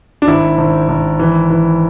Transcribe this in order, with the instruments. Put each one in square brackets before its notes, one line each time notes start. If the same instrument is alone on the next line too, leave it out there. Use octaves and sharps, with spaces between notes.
[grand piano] D4
G#1 E4
G#1
G#1
E3
E3